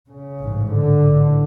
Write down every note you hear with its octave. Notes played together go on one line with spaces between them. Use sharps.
C#3
A1 G#2
D3
A1 A2